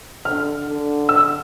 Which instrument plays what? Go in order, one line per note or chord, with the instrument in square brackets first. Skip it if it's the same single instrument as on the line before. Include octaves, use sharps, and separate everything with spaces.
[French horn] D3 [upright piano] F6
[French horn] D3
[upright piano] E6